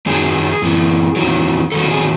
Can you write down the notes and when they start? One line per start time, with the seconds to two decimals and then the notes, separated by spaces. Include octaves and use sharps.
0.06 F#2 D#3 F#3 G#4
0.62 F#2 E3
1.16 E2 D#3 F#3
1.72 E2 D#3 F#3 A4
1.90 G#4